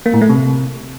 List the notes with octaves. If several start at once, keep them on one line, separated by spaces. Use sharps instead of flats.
A#3
A2
A3
C3